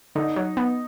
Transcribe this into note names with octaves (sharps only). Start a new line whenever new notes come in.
D3 D#4
F#3
B3